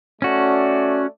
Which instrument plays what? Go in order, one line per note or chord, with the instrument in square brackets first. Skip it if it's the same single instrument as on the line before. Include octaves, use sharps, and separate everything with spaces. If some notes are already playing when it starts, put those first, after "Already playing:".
[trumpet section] A3 D5 [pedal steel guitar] C#4 F#4